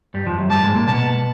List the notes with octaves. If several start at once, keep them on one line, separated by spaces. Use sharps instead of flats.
G2 G3
F2 F3
F#2 F#3
G2 G3 A5
G#2 G#3
A#2 A#3
B2 B3 A5